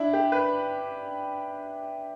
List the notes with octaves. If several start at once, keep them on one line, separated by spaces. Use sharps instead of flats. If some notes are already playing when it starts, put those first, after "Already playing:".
Already playing: D4 E4
G4
B4